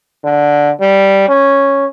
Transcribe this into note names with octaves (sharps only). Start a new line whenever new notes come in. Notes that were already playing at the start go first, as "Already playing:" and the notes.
D3
G3
C#4